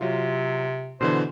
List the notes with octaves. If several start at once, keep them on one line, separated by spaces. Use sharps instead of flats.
C3 F#3 F4
B2 D3 E3 C5